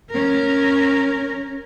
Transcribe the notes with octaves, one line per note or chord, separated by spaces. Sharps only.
C#4 A#4